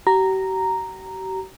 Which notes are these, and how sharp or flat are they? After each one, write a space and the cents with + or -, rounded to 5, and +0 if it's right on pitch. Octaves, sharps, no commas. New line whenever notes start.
G4 -45 A#5 -5